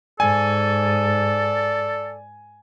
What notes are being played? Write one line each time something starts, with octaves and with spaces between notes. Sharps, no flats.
G#2 A4 D5 G#5